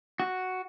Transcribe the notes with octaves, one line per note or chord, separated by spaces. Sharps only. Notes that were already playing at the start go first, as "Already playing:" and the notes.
F#4